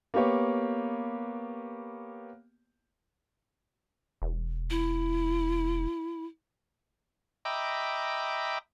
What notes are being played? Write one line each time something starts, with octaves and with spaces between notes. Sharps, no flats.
A#3 B3 G4 C#5
E1
E4
D#5 E5 G5 A#5 B5 D6